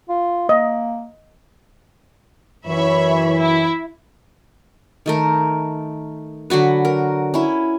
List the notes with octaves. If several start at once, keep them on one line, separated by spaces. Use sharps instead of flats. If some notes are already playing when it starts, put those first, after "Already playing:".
F4
A#3 D#5
F#2 E3 C#5 E5 B5
E4
D#3 A3 A#4
D3 F#3 F#4 B4
A#4
C#4 E4